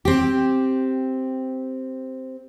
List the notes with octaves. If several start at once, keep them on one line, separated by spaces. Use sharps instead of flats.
C4 G4